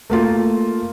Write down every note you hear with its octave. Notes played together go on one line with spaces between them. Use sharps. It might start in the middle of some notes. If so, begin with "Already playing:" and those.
A3 A#3 F4